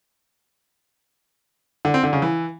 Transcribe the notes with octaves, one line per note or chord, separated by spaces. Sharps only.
D3
C4
D3
C#3
E3